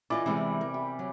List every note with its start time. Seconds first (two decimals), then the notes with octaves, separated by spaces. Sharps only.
0.10 E3 E4 F4 D5 D#5
0.26 C3 E3 G3 G#3 B3
0.61 A#4
0.74 G4
0.99 F#3